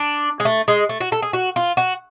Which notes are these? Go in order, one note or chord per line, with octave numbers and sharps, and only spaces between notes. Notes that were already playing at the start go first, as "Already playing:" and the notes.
Already playing: D4
G#3
A3
G#3
A3
F#4
A4
G#4
F#4
F4
F#4